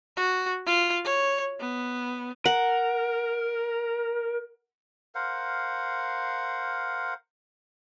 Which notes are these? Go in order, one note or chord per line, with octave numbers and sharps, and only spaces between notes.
F#4
F4
C#5
B3
A#4 F#5
A#4 C5 F5 F#5